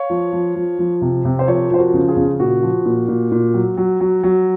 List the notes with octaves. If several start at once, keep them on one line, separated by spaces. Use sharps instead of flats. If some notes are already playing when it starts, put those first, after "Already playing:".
Already playing: C#5 F5
F3
F3
F3
F3
C3
C3
C5
F3 A#4 C#5
F3 C5
F#4 A#4
C#3
F4 G#4
C#3
A#2 F#4
F3
A#2
A#2
A#2
F#3
F#3
F#3
F#3